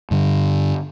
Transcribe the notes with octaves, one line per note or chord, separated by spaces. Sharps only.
G2 D3